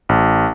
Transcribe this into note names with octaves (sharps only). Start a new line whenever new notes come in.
A1